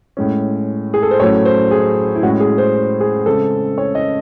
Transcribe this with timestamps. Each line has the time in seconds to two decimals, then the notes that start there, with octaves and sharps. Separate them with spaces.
0.17 A2 G#3 C#4
0.94 G#4
1.03 A4
1.11 C5
1.20 A2 F#3 A3 C#4 C#5
1.45 C5
1.71 G#4
2.15 E4
2.23 A2 G#3 C#4 F#4
2.40 G#4
2.58 C5
3.00 G#4
3.26 C#3 G#3 C4 A4
3.78 C#5
3.95 D#5